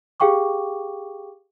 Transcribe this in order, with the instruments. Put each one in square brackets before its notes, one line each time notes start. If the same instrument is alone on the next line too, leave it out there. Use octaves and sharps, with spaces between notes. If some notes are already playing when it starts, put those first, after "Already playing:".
[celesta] G4 G#4 F5 G5 C#6 D6